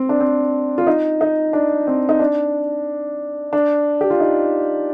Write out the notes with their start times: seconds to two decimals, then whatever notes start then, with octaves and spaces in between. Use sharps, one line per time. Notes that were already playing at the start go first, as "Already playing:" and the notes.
Already playing: C4
0.09 D4
0.20 C4
0.78 F4
0.87 D#4
1.21 D#4
1.53 D4
1.87 C4
2.09 D#4
2.19 D4
3.53 D4
4.01 G4
4.10 F4
4.20 D#4